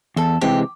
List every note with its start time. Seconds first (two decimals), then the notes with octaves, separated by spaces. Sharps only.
0.16 E2 A4
0.41 C3 E3 G#3 C4 G4